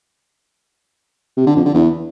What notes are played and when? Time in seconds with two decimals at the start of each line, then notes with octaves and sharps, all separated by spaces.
1.37 C3
1.47 D3
1.56 F2
1.65 D3
1.74 E2